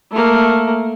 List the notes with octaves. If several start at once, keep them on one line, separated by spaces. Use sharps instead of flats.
A3 A#3